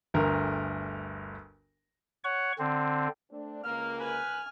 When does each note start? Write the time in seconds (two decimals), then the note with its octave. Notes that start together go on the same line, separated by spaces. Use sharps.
0.14 G1 D2 A#4
2.24 C#5 F#5 C#6
2.59 D3 C4
3.31 A3 C4 D4
3.64 C#2 A#3 F6
4.00 C2 B4 G#5 F6